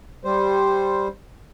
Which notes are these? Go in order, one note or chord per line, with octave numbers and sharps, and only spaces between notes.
G3 C5